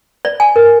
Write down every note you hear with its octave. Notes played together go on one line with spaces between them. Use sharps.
D5
G#5
A#4